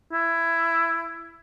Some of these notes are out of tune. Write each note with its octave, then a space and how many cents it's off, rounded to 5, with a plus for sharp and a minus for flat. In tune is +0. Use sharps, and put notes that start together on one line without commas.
E4 +15